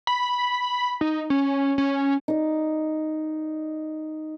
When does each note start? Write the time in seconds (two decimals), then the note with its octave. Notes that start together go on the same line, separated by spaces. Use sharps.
0.07 B5
1.01 D#4
1.30 C#4
1.78 C#4
2.28 D#4 D5